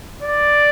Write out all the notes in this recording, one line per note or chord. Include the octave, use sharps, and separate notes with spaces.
D5